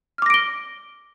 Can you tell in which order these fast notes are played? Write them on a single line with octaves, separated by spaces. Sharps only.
F6 D6 A#6 D7 G7